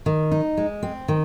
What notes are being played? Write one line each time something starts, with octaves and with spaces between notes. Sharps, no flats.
D#3
D#4
G#3
C4
D#3